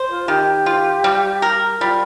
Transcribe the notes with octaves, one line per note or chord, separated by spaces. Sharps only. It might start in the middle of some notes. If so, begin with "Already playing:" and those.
Already playing: C5
F4
D#3 G4
F4
G3
A#4
G3 F4